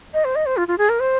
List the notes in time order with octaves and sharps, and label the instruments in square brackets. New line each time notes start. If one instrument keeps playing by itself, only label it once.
[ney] D#5
C5
D#5
C5
F4
F4
G#4
A#4
C5